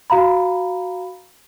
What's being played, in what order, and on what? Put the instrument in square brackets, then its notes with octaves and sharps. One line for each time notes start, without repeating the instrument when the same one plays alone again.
[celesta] F#4 F5 A#5 B5